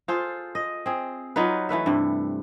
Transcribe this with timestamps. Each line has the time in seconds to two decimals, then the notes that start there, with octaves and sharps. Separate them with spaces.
0.08 F4 G#4 A4 C5
0.55 D#5
0.86 C4 G#4
1.36 F#3 D#4 F4 B4
1.69 E3 A3 B4 E5
1.86 G2 C3